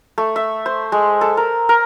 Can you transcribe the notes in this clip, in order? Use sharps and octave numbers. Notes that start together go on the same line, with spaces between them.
A3
E5
C5
G#3
A4
A#4
A#4